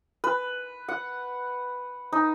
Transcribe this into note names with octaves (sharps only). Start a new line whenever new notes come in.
B4
F#5
D#4